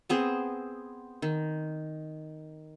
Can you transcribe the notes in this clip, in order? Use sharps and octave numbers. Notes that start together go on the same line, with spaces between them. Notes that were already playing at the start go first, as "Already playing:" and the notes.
B3 C4 G#4
D#3